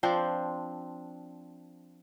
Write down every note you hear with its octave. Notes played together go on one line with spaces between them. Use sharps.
F3 C4 D4 C5